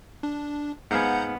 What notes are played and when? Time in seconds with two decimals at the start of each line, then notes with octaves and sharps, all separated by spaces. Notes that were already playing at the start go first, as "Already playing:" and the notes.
0.23 D4
0.91 G#2 B3 F5 F#5 G#5 A#5 G6